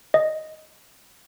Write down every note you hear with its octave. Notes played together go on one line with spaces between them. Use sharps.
D#5